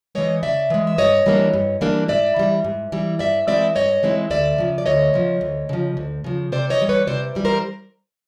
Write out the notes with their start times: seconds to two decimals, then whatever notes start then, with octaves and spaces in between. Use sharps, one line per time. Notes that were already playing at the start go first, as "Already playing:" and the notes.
0.15 E3 G#3 C#5 D#5
0.43 C#3 D5 E5
0.70 E3 G#3
0.87 E5
0.98 G2 C#5 D#5
1.26 E3 G3 A#3 D4
1.54 G2
1.81 E3 G3 A#3 D4
2.08 G#2 D5 E5
2.36 E3 G3
2.64 G#2
2.92 E3 G3
3.19 G2 D5 E5
3.47 E3 G#3 C4 E4 D5 E5
3.75 G2 C#5 D#5
4.03 E3 G#3 C4 E4
4.30 D2 D5 E5
4.58 C#3 F3
4.78 D5
4.86 D2 C#5 D#5
5.14 C#3 F3
5.41 D2
5.69 C#3 F3
5.97 D2
6.24 C#3 F3
6.52 C3 C5 D5
6.70 C#5 D#5
6.80 E3 G3
6.89 B4 C#5
7.07 C3 C5 D5
7.35 E3 G3
7.45 A#4 C5